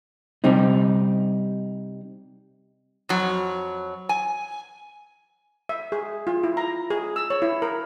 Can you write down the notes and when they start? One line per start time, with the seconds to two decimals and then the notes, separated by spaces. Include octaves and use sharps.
0.44 C3 G3 C4 D#4
3.09 F2 F#3
4.09 G#5
5.69 E5
5.92 G#4
6.27 F4
6.44 E4
6.57 A#5
6.90 G#4
7.16 E6
7.30 C#5
7.42 E4
7.62 A#4